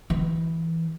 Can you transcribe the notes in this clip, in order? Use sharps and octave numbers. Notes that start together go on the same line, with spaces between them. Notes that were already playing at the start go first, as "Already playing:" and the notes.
E3